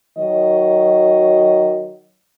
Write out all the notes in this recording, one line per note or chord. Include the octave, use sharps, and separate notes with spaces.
D#3 F#3 C#5 D#5